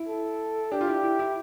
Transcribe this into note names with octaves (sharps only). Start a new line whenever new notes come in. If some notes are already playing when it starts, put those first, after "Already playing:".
Already playing: E4
A4
D4 G4
F4
E4
E4
E4